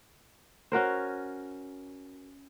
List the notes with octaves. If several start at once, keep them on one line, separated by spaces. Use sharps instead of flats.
C#4 F#4 A#4 C5